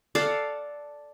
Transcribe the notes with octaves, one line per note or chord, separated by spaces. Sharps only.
A4 D5 F5 F#5